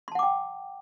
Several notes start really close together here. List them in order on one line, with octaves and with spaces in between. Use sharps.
C6 A5 F#5 D6 G5